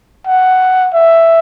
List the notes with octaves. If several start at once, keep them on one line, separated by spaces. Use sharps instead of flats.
F#5
E5